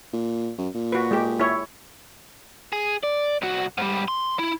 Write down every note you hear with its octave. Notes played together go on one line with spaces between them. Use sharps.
A#2
F#2
A#2
F#4 B4
G#3 G4
E4 C#5
G#4
D5
C2 F#4
G#2 G3
C6
E4